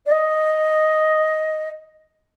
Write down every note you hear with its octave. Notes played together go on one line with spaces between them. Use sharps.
D5
D#5